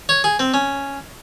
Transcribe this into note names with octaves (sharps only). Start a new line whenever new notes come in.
C#5
G#4
C4
C#4